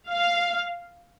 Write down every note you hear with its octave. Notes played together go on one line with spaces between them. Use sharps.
F5